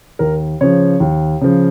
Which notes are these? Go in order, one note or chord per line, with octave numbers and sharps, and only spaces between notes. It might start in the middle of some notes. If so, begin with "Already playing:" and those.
D#2 A#4
C#3 F3 C#5
D#2
C#3 F3